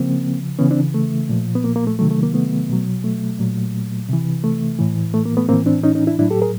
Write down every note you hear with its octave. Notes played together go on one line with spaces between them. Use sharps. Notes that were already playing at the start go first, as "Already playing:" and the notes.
Already playing: C#3 F3 A#3 C4
C#3 E3 B3 C#4
C4 D4
A3
A#2 F3
B3
A#3
A#3
A3
C3 D#3 F#3 A3
A3
A#3
A3 B3
B2 F#3
A3
A#2 F#3
C3 E3
A3
A2 E3
A3
A#3
A3 B3
A2 E3 A#3 C4
C4 D4
C#4 D#4
C#4 D#4
D4 E4
A2 F#3 D4 E4
G4 A4
G#4 A#4